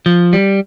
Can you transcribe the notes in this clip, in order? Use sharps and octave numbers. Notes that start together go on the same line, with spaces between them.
F3
G3